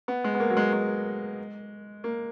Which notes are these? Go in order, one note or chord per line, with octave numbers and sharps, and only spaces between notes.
B3
G#3
B3
A#3
F#3
G#3
G#3
A#3